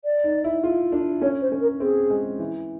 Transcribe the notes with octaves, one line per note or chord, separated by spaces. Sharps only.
D5
D#4
E4
F4
D4
C#4 C#5
C5
C#4
A#4
C4 G#4
G#3
E3